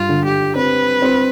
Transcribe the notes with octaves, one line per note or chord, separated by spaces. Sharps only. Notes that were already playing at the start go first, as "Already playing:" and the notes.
Already playing: G2 F4
D3
G4
C4 B4
C4